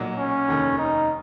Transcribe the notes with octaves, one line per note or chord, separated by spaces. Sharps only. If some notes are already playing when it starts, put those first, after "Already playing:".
Already playing: B1 A#2 F#3
C#4
F1 D#2 D#3
D#4